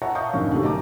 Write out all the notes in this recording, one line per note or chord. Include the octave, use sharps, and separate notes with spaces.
C#5 E5 F#5 A5 A#5 C#6
D#5 F5 C#6 D#6 G6
B1 F2 D3 C#4 A#4
B1 C3 A3 F#4
D#5 A5 A#5 D6